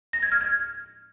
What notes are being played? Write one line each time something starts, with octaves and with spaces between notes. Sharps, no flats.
A#6
G#6
F6
G#6